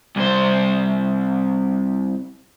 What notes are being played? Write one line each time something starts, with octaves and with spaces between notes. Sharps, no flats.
C2 C5